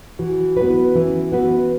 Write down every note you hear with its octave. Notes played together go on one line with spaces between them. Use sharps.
E3 F#4
B3 E4 F#4 B4
E3 C#4
B3 F#4 B4